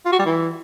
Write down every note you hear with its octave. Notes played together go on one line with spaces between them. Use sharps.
F4
F#4
G3
E3